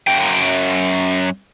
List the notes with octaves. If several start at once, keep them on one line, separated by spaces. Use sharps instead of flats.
F#2 G5